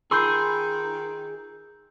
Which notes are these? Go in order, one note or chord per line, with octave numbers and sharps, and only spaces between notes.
D#3 F4 G#4 B5 C6 E6 G6